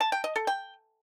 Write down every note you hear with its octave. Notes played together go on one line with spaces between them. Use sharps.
A5
G5
D#5
A4
G5